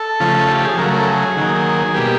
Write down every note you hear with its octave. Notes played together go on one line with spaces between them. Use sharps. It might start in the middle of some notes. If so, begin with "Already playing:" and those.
Already playing: A4
C#3 F3 A3
G4
G#4
C#3 F#3 A3 A#4
A#4
A4
G#4
D#3 F#3 A#3
B2 G3 A#3 G4